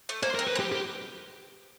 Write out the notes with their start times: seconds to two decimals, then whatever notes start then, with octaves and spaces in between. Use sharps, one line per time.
0.09 A3
0.23 A#3 C5
0.35 A#4
0.39 C4
0.47 B4
0.55 C4
0.60 G4
0.72 G4